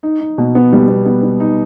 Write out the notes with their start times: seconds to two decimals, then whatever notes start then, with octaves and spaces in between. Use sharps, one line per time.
0.03 D#4
0.20 D#4
0.38 B2
0.55 B3
0.72 G3
0.88 B3
1.06 B3
1.23 B3
1.40 D#4